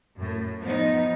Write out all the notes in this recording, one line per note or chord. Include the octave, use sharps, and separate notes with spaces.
F#2 A2
F3 B3 D#4